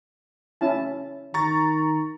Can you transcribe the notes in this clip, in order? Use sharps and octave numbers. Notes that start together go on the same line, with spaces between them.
C#4 E4 A5
D#3 A#5 C#6 A6